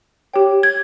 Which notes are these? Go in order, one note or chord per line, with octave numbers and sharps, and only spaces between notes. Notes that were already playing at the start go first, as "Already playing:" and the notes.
G4 C#5 G5
G#6